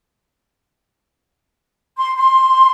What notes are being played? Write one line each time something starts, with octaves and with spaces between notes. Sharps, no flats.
C6
C6